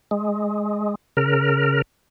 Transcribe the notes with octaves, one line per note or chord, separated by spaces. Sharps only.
G#3
C#3 A#4